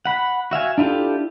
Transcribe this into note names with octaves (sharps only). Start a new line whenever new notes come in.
F#5 B5
F#4 E5 F5 G#5
D4 E4 F4 G4 A4